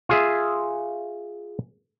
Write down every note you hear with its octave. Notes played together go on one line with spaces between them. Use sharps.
F4 G#4 E5